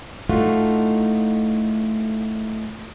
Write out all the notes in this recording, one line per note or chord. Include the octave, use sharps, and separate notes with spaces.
A2 A3 D#4 F4 F#4